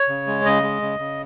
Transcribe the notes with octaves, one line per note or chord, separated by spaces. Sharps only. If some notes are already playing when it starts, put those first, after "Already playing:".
Already playing: C#5
C#3
G#3
C#3 D#5
G#3
C#3
C#3